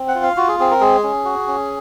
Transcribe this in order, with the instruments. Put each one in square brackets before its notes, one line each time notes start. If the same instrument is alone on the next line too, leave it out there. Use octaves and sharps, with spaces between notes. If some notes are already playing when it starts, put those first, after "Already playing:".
Already playing: [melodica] C4
F#5
F4
F5
F4 F#4
G#4
C4 G#4
A#4
G#3 G#4
C#4
F#4
C#4